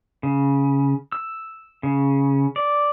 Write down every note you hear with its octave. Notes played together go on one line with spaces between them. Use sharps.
C#3
E6
C#3
D5